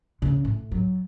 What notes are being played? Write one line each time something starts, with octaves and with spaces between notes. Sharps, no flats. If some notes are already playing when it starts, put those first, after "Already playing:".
C#3 E3
A2
F#3